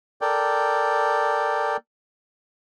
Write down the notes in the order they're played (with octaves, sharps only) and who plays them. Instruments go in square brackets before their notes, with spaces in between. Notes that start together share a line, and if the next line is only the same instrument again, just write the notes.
[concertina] A4 A#4 D5 G5